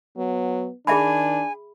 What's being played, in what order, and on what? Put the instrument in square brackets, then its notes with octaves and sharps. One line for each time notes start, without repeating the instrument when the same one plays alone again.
[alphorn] F#3 [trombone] B3
[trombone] D#3 [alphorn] D4 [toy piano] G#4 E5 B5 [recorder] G#5